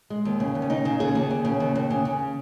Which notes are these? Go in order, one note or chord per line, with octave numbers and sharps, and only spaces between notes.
G#3
D#2
C#3
D#2
C#4
C#3 D#4
C#3
D#2 G#4
D#2
D#2
C#3
D#2
D#2
C#3
C#3